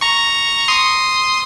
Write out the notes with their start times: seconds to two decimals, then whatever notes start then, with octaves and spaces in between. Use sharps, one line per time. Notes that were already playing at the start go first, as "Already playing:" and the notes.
0.01 A#5 C#6
0.68 C6 D#6